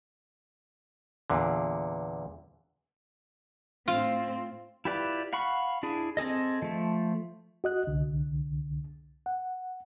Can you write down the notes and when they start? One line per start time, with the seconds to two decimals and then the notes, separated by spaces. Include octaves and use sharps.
1.30 E2 A#2 D3
3.88 A2 C4 F4
4.85 E4 F4 G4 B4 D5
5.33 F5 F#5 B5 C#6
5.83 D4 E4 G#4
6.17 C4 G#4 A4 D#5
6.62 F3 A3
7.64 F#4 D#5 F#6
7.87 C2 D3
9.26 F#5